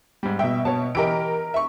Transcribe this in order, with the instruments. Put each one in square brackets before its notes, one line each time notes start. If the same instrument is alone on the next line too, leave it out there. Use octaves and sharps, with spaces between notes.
[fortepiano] G#2 G3
[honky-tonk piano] B2 E5 [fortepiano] G5
[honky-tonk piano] B2 [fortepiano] C#5 A5
[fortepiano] E3 G4 D#5 [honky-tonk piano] A#4 D7
[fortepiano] E5 C#6